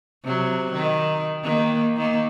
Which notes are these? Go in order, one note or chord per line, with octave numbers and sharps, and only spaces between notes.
C3 F#3
D#3
D#3 A#3
D#3 A#3